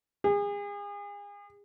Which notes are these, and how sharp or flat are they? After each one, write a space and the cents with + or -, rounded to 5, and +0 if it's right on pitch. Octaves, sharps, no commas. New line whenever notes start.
G#4 -35